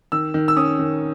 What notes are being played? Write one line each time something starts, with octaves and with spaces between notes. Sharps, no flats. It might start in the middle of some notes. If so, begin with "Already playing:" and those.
D#3 E6
D#3
E6
C#4 D#6
D#3